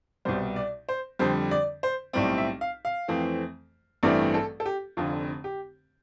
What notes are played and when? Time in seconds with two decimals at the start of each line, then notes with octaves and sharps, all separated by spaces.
0.25 C2 B2 G3 C5
0.56 D5
0.89 C5
1.19 F2 D3 G3 C5
1.51 D5
1.83 C5
2.13 B1 A2 G3 C4 D5
2.38 E5
2.61 F5
2.85 F5
3.08 F2 E3 A3 C4
4.03 A1 G2 E3 A3 C4 D5
4.34 A4
4.60 A4
4.66 G4
4.97 F1 F2 D3 F4
5.44 G4